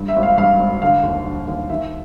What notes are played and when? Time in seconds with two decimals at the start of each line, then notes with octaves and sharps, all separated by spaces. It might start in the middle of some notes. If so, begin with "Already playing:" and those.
Already playing: G2
0.08 E5
0.16 G#1
0.23 F5
0.38 G2 F5
0.59 G#1
0.82 D3 F5
1.03 D#2
1.25 D3
1.47 D#2
1.70 D#3 E5